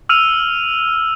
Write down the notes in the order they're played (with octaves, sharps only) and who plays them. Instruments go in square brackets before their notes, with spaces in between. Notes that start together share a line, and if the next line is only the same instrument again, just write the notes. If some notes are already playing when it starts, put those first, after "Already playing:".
[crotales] E6 F6 D#7 F7